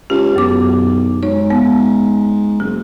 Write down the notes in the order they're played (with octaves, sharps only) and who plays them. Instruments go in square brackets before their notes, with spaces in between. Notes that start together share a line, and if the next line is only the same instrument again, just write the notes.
[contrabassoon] C#2 [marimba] G4
[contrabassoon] B1 [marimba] F#2 D6
[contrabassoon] G#2 [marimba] D#4 C#5
[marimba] B3
[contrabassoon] F#1 [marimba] G#4